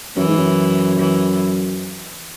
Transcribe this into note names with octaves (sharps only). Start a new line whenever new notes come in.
F#2 E3
G#2
F#2
E3